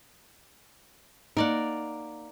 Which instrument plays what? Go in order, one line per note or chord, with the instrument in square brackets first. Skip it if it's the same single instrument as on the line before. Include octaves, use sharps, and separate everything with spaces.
[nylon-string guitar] A#3 D#4 [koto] A#4 D5 F#5